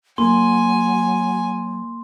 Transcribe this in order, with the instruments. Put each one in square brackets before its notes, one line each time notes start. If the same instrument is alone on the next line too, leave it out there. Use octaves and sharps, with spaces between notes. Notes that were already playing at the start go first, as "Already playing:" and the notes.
[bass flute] F#3 [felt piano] A#3 [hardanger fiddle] G#5 [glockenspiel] C6